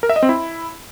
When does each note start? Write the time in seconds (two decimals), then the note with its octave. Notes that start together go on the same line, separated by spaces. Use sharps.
0.03 A#4
0.09 E5
0.16 D#5
0.23 C4
0.29 E4